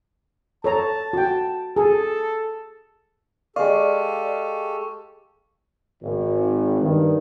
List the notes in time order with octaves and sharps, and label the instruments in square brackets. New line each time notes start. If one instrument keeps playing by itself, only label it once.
[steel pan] A4 C#5 A#5 [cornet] A5
[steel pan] F#4 G5
[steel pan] G#4 [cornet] A4
[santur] G#3 F5 [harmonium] G4 A4 [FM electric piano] D5 [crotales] C#6
[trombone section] G#1
G2 D#3